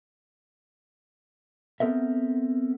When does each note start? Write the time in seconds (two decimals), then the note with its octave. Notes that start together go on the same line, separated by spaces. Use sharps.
1.80 B3 C4 A4 A#4 E5